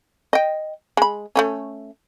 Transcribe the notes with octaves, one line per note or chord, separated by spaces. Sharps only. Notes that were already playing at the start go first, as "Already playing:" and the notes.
D#5 G5
G#3 B5
A3 A#3 C#4